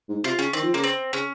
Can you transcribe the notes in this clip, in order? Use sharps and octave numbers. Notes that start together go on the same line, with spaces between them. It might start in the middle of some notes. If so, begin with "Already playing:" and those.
G#2
C3 F4
C#3 C#4
D#3 C4
F3
C#3 A#3
C4
C#3 C#4